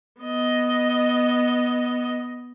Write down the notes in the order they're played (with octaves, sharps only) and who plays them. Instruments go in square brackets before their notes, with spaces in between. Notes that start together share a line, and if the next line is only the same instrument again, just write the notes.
[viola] B3 D#5